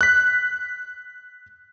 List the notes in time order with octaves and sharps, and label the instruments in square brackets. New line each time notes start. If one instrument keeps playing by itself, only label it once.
[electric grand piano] F#6 B6